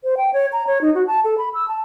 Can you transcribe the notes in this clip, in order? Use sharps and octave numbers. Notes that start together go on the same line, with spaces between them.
C5
G5
C#5
A#5
C#5
D#4
F#4
A5
A4
B5
E6
A5